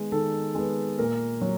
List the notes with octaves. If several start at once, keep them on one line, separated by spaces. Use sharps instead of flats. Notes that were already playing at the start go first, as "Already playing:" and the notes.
Already playing: D#3 G#3 B3
D#3 A4
G#3 B3
A#2 A#4
F#3